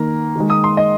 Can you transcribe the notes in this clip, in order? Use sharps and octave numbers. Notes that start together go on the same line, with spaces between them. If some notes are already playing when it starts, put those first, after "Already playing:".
Already playing: D#3 A#3 A#5
D#3 G#3
D#6
C6
D#5